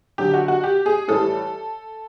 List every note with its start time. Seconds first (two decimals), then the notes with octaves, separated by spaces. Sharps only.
0.18 D3 F#3 G4
0.34 F#4
0.48 F#4
0.64 G4
0.86 G#4
1.08 A2 E3 G3 A4